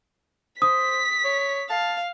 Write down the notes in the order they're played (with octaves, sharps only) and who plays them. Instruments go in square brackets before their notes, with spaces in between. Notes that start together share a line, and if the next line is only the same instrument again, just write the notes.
[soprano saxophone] C5 [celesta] D#6 [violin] B6
[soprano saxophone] C#5
[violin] F5 [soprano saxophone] A5